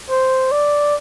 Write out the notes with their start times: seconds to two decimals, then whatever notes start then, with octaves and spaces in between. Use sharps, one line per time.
0.10 C5
0.51 D5